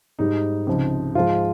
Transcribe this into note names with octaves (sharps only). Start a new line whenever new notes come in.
G#2 G3 D#4
C#2 C3 F3
G#2 F3 G#3 F4